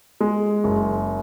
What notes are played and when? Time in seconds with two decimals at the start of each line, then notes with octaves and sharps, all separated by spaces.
0.21 G#3
0.64 F#1